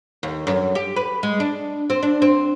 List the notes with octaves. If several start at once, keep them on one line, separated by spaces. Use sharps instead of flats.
D#2
F#2
G4
B4
G#3
D4
C4
D4
C4